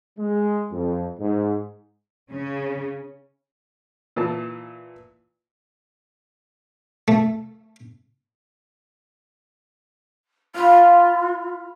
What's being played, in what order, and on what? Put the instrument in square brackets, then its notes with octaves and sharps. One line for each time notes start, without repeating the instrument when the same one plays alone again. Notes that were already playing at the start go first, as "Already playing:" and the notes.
[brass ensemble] G#3
F2
G#2
[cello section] C#3 C#4
[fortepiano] A#2 E3 A5
[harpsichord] A3
[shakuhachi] F4 [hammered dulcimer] F5 B5